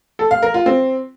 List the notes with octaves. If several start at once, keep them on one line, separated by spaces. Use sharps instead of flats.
A4
F5
A#4
F4
C4